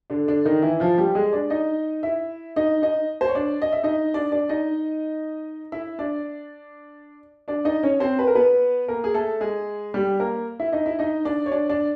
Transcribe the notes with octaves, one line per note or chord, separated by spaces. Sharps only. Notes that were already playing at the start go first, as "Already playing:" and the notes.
D3 D4
D3 D4
D#3 D#4
E3 E4
F3 F4
G3 G4
G#3 G#4
D4 D5
D#4 D#5
E4 E5
D#4 D#5
D#4 D#5
C5
C#5
D4 D5
D#5
E5
D#4 D#5
D4 D5
D4 D5
D#4 D#5
E4 E5
D4 D5
D4 D5
D#4 D#5
C#4 C#5
C4 C5
B4
A#4
B3 B4
A#3 A#4
G#4
A3 A4
G#3 G#4
G3 G4
A#3 A#4
E4 E5
D#4 D#5
E4 E5
D#4 D#5
D4 D5
C#5
D4 D5
D4 D5